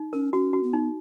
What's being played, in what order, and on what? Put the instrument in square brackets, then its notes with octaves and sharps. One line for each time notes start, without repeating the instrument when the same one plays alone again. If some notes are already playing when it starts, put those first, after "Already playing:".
Already playing: [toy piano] D#4
[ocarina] C#4 [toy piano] A#4
[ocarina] C#4 [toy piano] F#4
[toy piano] F#4
[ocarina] B3
[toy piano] D#4